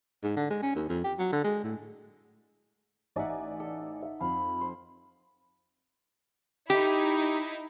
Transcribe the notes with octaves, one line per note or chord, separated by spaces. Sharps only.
G#2
D3
G#3
C#4
D#2
F2
G4
F#3
D3
G#3
A2
A1 D#4 D5 E5 F#5 G#5
A4
E5
F2 F5 B5
C5
D#4 E4 G4